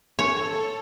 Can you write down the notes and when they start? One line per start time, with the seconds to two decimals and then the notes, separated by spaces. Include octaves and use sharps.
0.19 A4 C#5